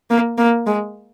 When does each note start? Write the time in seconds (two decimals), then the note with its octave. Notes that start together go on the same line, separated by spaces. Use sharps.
0.10 A#3
0.38 A#3
0.67 G#3